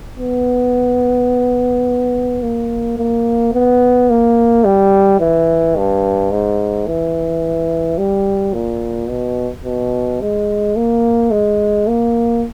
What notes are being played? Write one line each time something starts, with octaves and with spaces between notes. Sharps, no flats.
B3
A#3
A#3
B3
A#3
G3
E3
G2
G#2
E3
G3
A#2
B2
B2
G#3
A#3
G#3
A#3